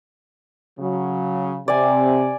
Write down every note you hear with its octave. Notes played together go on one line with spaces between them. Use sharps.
C#3 F#3
C3 D5 G#5